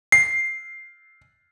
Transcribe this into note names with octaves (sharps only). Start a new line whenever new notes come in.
C7